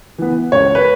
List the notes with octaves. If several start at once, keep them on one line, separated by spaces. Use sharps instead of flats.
E3 B3
C#2 C#5
B4